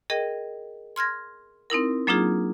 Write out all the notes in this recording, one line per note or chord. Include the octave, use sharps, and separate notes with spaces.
G#4 A#4 D#5 G5
C6 F6 G#6 A#6
C4 D#4 E4 A#4
F#3 A#3 D4 D#4 F4 G#4